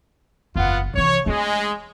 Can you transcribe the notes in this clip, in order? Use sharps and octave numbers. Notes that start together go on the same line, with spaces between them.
F#1 E2 B3 F4 F#5
C2 E3 C#5
G#3 A3 D4